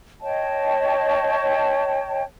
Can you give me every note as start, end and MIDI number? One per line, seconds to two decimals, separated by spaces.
0.21 2.23 73
0.21 2.23 75
0.21 2.23 79
0.21 2.23 81